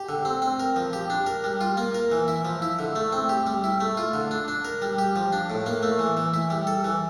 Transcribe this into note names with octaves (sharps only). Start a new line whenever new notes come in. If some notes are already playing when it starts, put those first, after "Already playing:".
Already playing: G4
D3
C4
C4
A#4
F3
G4
D4
A#4
G3
F4
A#3
A#4
E3
E4
F3
E4
D3
A3
C4
G4
G3
E4
A3
F4
D3
D4
D4
A#4
G3
G4
F3
D4
A2
A#3
A3
E3
E3
E4
G3
A4
E3